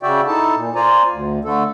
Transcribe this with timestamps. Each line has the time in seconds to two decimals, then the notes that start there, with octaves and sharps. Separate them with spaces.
0.03 C#3 F#4 D5 E5 G5
0.27 D#4 E4 A4 A5
0.55 A#2
0.75 F4 C5 D5 G#5 A#5
1.11 D2
1.45 D3 A3 A4